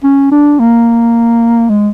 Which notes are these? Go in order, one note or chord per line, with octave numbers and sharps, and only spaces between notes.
C#4
D4
A#3
G#3